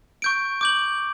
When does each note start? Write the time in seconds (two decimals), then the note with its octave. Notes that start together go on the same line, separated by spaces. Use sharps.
0.22 C#6 G6 D7
0.61 D6 G6 F#7